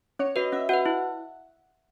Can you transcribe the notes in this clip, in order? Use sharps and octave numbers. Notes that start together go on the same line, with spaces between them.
C#4 C#5
F#4 B4 D#5
C#4 E5
F#4 B4 F#5
E4